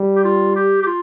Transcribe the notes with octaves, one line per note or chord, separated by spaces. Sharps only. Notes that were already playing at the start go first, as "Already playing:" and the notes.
Already playing: G3
G4
F4
G4
G4
F4